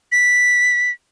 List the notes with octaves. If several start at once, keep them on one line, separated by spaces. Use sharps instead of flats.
B6